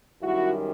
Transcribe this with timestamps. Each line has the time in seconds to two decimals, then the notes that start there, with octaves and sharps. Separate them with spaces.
0.21 F#2 D#3 G3 E4 F#4